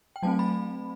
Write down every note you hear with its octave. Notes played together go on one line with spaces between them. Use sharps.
G5
F#3 A3 C4 A5
B5